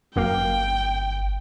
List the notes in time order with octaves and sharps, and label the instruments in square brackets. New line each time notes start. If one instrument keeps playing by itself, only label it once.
[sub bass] G1 [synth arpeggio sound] F#2 A#3 F5 [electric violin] G5